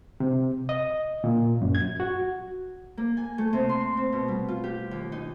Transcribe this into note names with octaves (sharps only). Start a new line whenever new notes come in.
C3
D#5
A#2
F#2
G#6
F#4
A#3
G#5
A3
C3
C6
C4
B2
G3
F4
G4
D#2
D#4